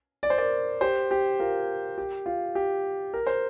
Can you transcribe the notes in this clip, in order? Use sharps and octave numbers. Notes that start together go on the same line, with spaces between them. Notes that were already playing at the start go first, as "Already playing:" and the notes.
D5
C5
A#4 D5
G4 C5
G4
F4 A#4
G4
F4
G4
A#4
C5